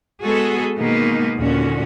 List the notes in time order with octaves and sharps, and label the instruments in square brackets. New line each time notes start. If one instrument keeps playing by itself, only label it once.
[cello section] G#3 B3 F#4 G#4 A4
B2 D#3 G#3 A#3 B3 D#4
D#2 A#2 D3 C#4 F#4